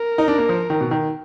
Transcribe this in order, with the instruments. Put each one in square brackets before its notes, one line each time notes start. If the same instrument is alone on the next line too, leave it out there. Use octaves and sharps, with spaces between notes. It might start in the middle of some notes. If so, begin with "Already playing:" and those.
Already playing: [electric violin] A#4
[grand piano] D#4
D4
A#3
F3
D#3
B2
D#3